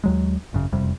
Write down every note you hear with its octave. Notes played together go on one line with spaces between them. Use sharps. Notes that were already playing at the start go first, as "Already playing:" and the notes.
D#2 F#3 G#3
G#1 F#2 C#3
E1 F2 C3 G3